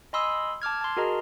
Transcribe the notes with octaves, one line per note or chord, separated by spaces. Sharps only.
D#5 G#5 B5 C6 D#6 E6
A5 D6 F6 G#6
A5 C6
F#4 G#4 A#4 D#5 A#5